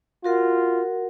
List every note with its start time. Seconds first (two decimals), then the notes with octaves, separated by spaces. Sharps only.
0.24 F4 F#4 A#4 F#5